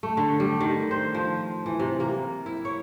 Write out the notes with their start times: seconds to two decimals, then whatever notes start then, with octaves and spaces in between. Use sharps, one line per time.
0.03 A3
0.17 D3
0.40 G3
0.60 D#3
0.91 C5
1.14 F3
1.66 E3
1.80 C3
2.00 A#3
2.46 E4
2.65 C#5